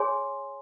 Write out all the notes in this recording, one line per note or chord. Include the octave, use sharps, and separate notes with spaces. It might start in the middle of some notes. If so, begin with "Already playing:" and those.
Already playing: G#4 C#5 G#5 C6